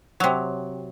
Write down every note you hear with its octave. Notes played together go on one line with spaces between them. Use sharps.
C3 F#3